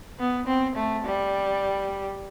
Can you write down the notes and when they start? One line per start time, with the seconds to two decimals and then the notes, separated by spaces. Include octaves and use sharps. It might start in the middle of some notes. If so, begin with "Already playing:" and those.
0.19 B3
0.47 C4
0.76 A3
1.04 G3